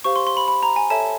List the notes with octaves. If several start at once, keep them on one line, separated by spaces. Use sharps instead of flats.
G4 C5 F5 C#6
C6
C6
B5
B5
A#5
G#5
A4 C#5 E5 A5